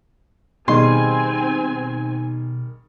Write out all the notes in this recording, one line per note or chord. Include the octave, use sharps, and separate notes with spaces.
B2 D#3 G3 C4 D#4 G#4 G#5 C6